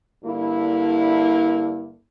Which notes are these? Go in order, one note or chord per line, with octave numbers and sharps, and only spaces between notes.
G2 D3 A#3 E4